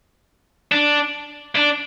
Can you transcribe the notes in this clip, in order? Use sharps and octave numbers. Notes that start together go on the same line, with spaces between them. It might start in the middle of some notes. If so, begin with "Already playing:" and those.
D4
D4